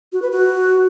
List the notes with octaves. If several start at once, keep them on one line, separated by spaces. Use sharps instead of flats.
F#4
B4
F#4